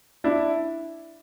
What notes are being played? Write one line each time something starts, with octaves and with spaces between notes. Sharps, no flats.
D4 E4